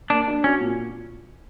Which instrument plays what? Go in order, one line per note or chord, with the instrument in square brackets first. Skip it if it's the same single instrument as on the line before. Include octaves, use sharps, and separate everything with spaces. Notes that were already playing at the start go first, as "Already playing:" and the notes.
[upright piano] A#3 [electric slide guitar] D4
[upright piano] D4
[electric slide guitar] C#4 [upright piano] F#4
[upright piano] A#2